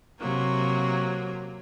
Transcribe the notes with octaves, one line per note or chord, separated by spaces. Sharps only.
C3 F#3 A#3